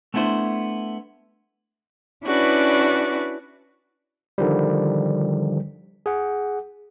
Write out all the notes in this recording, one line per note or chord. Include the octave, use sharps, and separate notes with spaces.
A3 B3 D4 E4 C5
C#4 D4 E4 F#4 B4 D5
D3 D#3 F3 G3
G#4 F#5